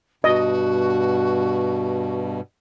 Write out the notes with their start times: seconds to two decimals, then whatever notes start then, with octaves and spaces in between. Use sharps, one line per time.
0.24 G2 B2 F#4 D#5